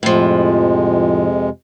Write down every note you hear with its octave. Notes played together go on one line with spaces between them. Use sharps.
F2 A2 C3 F3 G#3